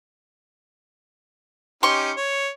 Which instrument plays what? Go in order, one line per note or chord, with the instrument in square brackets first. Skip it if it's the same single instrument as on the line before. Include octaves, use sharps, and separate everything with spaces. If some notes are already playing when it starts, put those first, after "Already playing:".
[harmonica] C#4 D#4 G4 [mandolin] C6 C#6
[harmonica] C#5